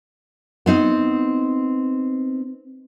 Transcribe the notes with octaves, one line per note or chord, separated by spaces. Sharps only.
B3 C4 D#4